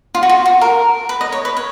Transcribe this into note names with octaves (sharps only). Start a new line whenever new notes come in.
F4
F#4
F4
F#4
A#4
B4
D#5
C#5
B4
C#5